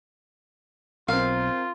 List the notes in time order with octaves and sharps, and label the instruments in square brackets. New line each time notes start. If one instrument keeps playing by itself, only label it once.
[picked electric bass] B1 [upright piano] C4 A#4 [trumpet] F4 [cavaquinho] F5